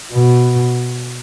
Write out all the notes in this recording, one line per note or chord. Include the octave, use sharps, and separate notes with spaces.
B2